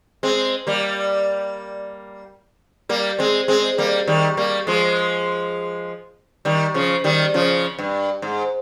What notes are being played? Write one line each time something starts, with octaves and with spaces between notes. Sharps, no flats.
G#3 C4
G3 A#3
G3 A#3
G#3 C4
G#3 C4
G3 A#3
D#3 G3
G3 A#3
F3 G#3
D#3 G3
C#3 F3
D#3 G3
C#3 F3
G2
G#2